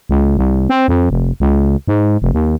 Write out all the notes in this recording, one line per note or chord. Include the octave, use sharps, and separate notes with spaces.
C#2
C2
C4
F2
F1
C#2
G#2
F1
D#2